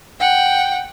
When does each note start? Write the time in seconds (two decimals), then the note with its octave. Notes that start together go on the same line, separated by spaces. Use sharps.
0.20 F#5 G5